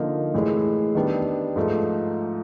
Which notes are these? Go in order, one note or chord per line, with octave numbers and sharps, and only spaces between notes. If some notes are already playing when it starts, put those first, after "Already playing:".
Already playing: D3 F3 A#3 D#4
A2 E3 G#3
D#3 G3 B3 D4
G#2 F3 A3